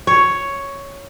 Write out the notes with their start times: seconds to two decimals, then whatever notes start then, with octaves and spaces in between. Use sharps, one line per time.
0.07 C#5